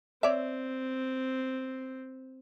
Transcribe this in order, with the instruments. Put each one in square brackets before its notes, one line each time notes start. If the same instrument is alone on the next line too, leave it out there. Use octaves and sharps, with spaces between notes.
[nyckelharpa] C4 [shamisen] C#5 D5 E5